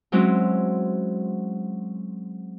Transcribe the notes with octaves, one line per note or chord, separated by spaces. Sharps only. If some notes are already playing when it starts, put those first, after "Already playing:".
F#3 G#3 C4 C#4 E4 F#4